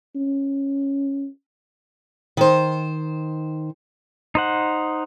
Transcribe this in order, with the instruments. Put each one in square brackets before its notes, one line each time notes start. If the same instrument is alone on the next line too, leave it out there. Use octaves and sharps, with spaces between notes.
[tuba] C#4
[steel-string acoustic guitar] D#3 C5
[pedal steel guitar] D#4 C5 F#5